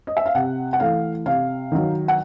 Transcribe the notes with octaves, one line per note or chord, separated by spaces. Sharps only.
D#5
E5
F5
C3 F#5
F#5
E3 A3 F5
C3 F5
D#3 F#3
F#5